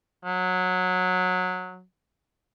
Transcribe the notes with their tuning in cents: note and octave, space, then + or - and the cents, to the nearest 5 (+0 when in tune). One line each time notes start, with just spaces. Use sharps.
F#3 -15